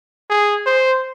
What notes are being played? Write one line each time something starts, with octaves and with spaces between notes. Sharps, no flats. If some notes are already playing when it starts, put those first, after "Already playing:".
G#4
C5